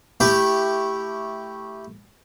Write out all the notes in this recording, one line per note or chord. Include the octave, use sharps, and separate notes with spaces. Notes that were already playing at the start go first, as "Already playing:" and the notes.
A3 E4 G4